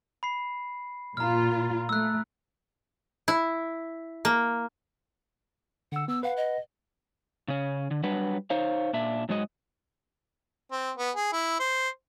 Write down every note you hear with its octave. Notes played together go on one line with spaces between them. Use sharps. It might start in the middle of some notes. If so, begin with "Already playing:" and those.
B5 C7
A#2 F4 A#5 F6
A3 E6 F#6
E4
A#3
D3 F#5 E6
B3 E6
B4 F5 F#5
D#5
C#3 C#4
D3
F#3 G3 D4 B4 F#5
D#4 C5 C#5 F5
A#2 D4 E5
G#2 F#3 G#3 F#4 G4 D#5
C4
B3
G#4
E4
C5